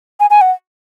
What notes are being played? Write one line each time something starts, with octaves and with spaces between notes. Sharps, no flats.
G#5
G#5
F#5